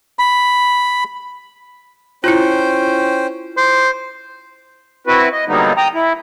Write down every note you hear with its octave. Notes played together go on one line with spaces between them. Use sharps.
B5
C#4 E4 F4 C5 G5
C5 D6
C4 E4 F#4 B4
D#5
D3 F#3 G3 A#3 B3 D#4
G5 A#5 D#6
E4